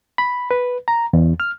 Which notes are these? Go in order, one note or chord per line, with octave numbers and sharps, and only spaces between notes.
B5
B4
A#5
E2
F6